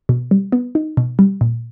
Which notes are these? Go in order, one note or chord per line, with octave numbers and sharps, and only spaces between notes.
B2
G3
B3
D#4
B2
G3
A#2